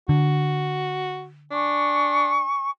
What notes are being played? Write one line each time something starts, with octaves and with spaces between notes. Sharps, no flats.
D3 F#4
D4 G#5 C#6